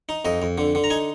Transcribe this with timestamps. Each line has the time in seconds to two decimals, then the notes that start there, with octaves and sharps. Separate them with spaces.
0.09 D#4
0.25 F2 D#5
0.42 F2
0.58 D3
0.75 D3
0.84 A#5
0.90 D#4 G#5